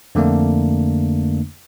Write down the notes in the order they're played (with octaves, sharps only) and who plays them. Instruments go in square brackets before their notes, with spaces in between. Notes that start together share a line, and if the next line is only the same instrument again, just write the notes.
[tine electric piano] F2 D3 A3 A#3 D4